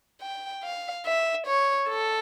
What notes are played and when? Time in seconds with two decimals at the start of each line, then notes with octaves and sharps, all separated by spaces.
0.22 G5
0.63 F5
1.06 E5
1.47 C#5
1.89 A4